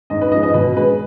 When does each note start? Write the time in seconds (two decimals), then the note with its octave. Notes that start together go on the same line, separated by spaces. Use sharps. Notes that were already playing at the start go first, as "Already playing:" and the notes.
0.10 G#2 D#5
0.21 B4
0.32 F3 G#3 D#5
0.43 D#5
0.54 B2 B4
0.76 G#3 B4